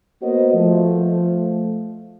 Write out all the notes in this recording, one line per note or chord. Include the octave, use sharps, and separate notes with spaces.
A#3 B3 F#4 A#4 C5 D#5
F3 A3